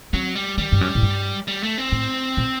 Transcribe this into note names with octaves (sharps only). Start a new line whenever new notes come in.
F#3 C4
G3
D#3 G3
G2
F#2
A2
G2
G3
A3
C4
A2
A#2